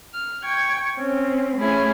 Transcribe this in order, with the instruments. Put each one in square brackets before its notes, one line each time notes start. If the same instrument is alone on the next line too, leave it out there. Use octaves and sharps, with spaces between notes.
[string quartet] F6
G5 C#6 G#6
C4 C#4
A3 C#4 E4 G#4